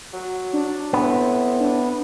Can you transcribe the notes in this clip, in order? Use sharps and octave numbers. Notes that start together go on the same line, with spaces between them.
F#3
D4
A2 B3 C4
D4